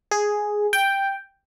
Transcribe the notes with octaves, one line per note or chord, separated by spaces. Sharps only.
G#4
G5